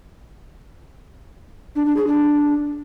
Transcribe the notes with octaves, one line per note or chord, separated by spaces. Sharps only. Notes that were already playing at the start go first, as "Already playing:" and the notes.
D4
D4
G#4
D4